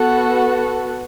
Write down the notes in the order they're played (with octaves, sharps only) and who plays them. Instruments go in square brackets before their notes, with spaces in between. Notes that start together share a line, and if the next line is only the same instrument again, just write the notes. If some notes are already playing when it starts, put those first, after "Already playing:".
Already playing: [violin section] B3 F#4 A4